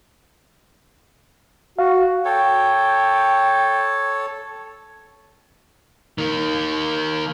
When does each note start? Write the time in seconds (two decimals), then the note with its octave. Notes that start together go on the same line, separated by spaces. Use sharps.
1.79 F#4 F5
2.25 A4 C#5 G5
6.18 D#3 A#3